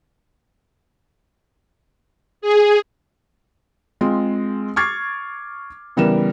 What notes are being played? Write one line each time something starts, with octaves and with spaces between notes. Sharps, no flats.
G#4
G#3 C4 F4
C#6 D6 F6 G#6 A6 C7
C#3 E3 G3 B3 A#4 E7